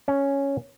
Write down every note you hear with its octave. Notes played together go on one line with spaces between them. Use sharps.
C#4